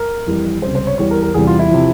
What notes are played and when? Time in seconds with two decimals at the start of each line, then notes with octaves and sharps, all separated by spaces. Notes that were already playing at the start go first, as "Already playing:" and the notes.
Already playing: A#4
0.27 F2 E3 G3
0.62 C#2 C3 G3 C5
0.75 C5
0.87 C#5
0.98 E2 E3 G3 C#5
1.11 A#4
1.22 A#4
1.34 E2 C3 E3 G3 G#4
1.47 F4
1.59 E4
1.71 C3 F3